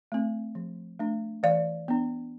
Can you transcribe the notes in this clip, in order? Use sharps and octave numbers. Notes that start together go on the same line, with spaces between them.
A3 C4
F3
A3 D4
E3 D5 F5
B3 D4